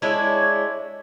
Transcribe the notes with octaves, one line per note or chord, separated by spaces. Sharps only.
G#3 D4 E4 C#5